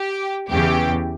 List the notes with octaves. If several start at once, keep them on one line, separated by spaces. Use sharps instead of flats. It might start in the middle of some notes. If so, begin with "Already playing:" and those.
Already playing: G4
E2 C#3 E3 G4